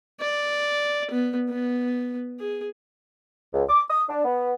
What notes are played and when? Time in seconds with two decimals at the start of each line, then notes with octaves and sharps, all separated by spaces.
0.20 D5
1.11 B3
1.49 B3
2.40 G#4
3.53 C#2
3.69 D6
3.89 D#6
4.09 D4
4.25 B3